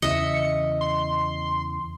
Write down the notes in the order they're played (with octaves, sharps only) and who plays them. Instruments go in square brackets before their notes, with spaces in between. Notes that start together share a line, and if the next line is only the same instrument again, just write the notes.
[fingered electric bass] E2 C#3 E3 [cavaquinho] D#5 E5 [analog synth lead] C#7
[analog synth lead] C6